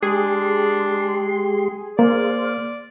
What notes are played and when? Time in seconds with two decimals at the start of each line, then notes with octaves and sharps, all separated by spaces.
0.03 G#3 D4 G4 G#4 C6
1.99 A#3 C5 D5 F5